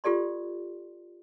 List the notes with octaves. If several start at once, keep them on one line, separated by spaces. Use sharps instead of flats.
F4 G4 A4 D5 C6